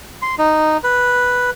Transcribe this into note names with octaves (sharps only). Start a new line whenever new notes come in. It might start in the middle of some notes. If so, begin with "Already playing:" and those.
C6
D#4
B4